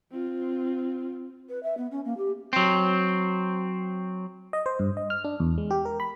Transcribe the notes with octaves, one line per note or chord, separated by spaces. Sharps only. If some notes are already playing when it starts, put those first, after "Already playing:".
C4 F4
B4
E5
B3
C#4
A#3
G4
F#3 C4
D#5
C5
G2
D#5
F6
D4
E2
G#3
G4
A#4
B5